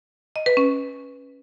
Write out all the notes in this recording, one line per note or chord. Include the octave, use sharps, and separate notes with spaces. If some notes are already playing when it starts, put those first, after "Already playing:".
D#5
B4
C#4